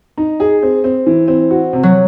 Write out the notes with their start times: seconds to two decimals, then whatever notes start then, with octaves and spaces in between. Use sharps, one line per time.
0.18 D#4
0.40 G#4
0.62 C4
0.84 C4
1.06 E3
1.28 C4
1.50 F#4
1.73 C3
1.83 F#3